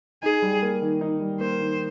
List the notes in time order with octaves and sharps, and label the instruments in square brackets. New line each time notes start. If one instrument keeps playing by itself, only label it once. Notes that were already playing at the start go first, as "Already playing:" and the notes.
[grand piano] D#4 [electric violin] G#4
[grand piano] G3
A#3
D#3
D#4
G3
[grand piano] A#3 [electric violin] C5
[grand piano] D#3